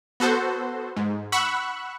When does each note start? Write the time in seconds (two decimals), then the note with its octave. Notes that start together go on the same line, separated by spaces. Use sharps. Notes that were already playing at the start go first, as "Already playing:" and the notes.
0.20 B3 F#4 A4 C5
0.97 G#2
1.32 F#5 B5 C#6 E6 F#6